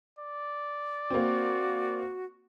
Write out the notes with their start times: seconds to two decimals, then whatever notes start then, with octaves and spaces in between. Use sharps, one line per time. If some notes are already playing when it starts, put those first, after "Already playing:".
0.19 D5
1.10 A#3 C4 F#4